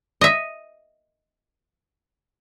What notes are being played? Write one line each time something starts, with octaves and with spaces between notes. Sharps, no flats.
D#5 E5